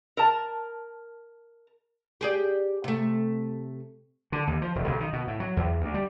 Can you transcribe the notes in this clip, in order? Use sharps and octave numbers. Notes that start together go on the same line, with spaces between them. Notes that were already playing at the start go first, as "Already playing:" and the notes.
A#4 A5
G4 G#4 D5
C3 A3
D3
D#2
F3
E1
B1
D#3
B2
A2
F#3
E2
D2
G3